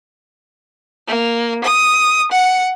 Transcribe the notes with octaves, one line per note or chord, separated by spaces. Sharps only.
A#3
D#6
F#5 C#7